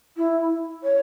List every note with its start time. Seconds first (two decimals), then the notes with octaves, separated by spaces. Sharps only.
0.17 E4
0.83 C#5